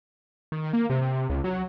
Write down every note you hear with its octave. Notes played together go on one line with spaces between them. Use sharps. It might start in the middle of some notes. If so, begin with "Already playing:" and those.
D#3
A#3
C3
C3
C#2
F#3